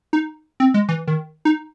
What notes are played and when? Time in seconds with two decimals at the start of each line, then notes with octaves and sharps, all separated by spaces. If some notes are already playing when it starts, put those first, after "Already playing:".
0.13 D#4
0.60 C4
0.74 G#3
0.89 E3
1.07 D#3
1.45 D#4